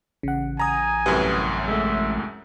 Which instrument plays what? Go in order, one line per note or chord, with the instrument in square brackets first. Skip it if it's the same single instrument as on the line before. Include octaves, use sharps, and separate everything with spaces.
[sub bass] A1 [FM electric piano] C#3 F#5
[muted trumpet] G#5 [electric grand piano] A#5 D#6
[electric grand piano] C2 F#2 A2 [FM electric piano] G4 B4 D#6
[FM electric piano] G#3 A3 [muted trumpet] E5